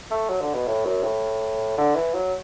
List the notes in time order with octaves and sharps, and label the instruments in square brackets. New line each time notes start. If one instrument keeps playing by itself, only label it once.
[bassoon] A3
F#3
D3
B2
A2
F#2
A2
D3
E3
F#3